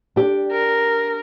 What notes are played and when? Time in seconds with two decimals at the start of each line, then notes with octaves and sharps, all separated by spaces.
0.16 D4 G4
0.52 A#4